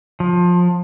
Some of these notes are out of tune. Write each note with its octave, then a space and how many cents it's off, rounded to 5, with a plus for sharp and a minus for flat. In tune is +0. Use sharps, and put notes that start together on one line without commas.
F3 +20